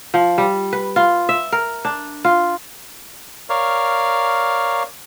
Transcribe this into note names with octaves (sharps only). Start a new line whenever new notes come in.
F3
G3
B4
F4
E5
A#4
D4
F4
A#4 C#5 D5 F5